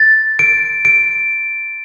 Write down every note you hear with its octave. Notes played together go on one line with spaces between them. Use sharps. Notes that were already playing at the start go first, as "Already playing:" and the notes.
Already playing: A6
D7
D7